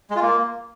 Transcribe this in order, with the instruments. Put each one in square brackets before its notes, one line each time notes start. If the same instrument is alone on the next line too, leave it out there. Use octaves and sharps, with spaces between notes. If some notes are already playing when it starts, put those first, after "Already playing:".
[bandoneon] G#3
F4
A#3